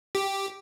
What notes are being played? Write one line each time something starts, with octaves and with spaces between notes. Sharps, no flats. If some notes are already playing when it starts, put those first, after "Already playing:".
G4